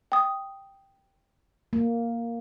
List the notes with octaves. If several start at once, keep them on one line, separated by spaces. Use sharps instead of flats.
G5 D#6
A#3